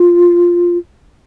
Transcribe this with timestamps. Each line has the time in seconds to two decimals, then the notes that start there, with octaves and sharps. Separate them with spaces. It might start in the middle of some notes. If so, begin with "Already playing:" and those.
Already playing: F4